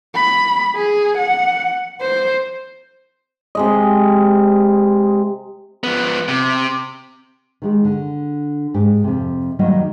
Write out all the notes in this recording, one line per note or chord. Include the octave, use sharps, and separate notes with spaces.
B5
G#4
F#5
C5
C3 G#3 D#5
F3 B3
C3
D#3 G#3 G4
D3
G#2 G4
F2 C3
D#3 F#3 G3 A#3 G4 D#5